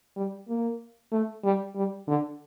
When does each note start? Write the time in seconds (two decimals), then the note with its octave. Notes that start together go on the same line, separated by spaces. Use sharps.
0.16 G3
0.48 A#3
1.12 A3
1.44 G3
1.75 G3
2.07 D3